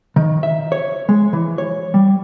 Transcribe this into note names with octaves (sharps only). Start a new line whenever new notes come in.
D#3
E5
C#5
G#3
E3
C#5
G3